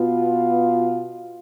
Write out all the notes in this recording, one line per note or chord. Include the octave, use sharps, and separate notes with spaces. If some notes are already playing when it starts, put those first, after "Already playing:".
Already playing: B2 B3 F4